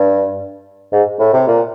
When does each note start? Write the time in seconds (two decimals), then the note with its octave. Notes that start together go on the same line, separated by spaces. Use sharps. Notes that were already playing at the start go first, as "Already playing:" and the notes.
Already playing: G2
0.93 G#2
1.19 A2
1.33 C3
1.48 A#2